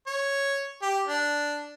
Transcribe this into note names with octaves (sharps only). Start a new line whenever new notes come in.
C#5
G4
D4